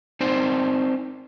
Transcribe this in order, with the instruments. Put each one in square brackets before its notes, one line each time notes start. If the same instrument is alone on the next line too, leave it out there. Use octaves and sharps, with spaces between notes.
[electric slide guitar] C4 D#4 C5 D5